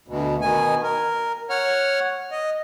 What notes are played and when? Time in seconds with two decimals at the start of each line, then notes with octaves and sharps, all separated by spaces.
0.08 D2 B2
0.41 B2 D#3 G#5
0.84 A#4
1.50 C#5 F#5 F6
2.31 D#5